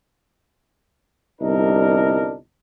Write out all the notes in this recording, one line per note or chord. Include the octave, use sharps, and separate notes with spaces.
G1 C2 D4 D#4 A#4